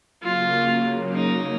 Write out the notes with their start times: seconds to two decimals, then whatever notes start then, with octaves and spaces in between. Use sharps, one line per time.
0.21 C#3 F#3 A#3 F4
1.12 D#4